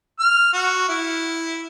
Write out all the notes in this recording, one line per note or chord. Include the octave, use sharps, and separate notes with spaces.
F6
F#4
E4